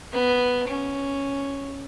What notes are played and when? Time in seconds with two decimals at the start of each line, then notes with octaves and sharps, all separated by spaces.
0.13 B3
0.68 C#4